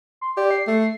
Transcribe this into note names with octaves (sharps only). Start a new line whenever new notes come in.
C6
G4 D5
C7
A3